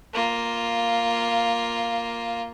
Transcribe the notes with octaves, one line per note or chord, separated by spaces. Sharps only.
A#3 F4